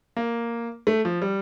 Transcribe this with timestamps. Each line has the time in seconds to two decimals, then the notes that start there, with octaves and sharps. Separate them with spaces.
0.17 A#3
0.87 A3
1.05 F3
1.22 G3